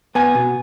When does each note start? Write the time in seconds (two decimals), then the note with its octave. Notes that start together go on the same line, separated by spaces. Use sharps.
0.15 B3 G#5
0.35 B2